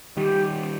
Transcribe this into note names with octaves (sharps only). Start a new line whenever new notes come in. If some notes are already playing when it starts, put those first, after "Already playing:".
D#3 G3 G4